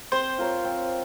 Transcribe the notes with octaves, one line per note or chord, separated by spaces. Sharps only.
C4 C5
F4 A#4 C#5
C4